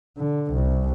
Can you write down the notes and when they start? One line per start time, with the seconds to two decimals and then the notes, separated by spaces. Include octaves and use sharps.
0.18 D3
0.52 C2